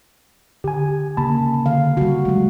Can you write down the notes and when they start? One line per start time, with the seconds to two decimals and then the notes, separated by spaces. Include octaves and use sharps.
0.64 D3 G4 G#5
1.17 C#3 A#3 A5 B5
1.66 D3 F5
1.97 G3 F#4
2.25 F#3 G#3